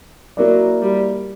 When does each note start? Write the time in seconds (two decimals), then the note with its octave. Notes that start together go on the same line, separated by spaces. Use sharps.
0.37 F#3 A#3 E4 A#4 D5
0.82 G3